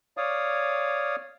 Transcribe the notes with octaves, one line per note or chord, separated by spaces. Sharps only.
C#5 D5 F5 D#6